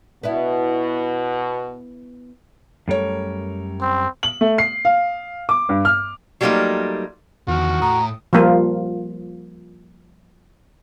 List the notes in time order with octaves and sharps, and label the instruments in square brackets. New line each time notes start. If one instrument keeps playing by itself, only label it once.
[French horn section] B2 [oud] B3 D4 E4
[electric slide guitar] F#2 G3 A#4 [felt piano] A3 C#5
[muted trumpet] C4
[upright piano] F#7
A3
C7
F5
D6
G2
F6
[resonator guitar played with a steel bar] F#3 G3 A3 A#3 D#4 F4
[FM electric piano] E2 F6 [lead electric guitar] D#3 F3 [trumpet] F#4
[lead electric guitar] A2 [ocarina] A#5 [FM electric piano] D#6
[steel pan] F3 G3 A#3 F4